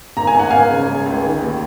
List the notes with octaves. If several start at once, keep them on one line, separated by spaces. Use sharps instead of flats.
G#1 A#5
G#5
G#1 F#5
G#1 F5 G#5
C#3
G#3
C#2
D#3
D#2